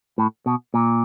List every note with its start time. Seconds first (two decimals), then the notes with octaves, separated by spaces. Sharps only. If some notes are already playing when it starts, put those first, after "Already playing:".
0.18 A2
0.46 B2
0.74 A#2